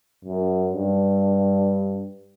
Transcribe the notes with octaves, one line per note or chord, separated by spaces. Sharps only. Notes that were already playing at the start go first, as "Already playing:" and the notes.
F#2
G2